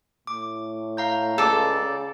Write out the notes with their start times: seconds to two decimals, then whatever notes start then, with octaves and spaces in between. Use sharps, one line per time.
0.27 A2 D6
0.97 F5 A#5 G6
1.38 C#2 A4 D5
1.81 C#3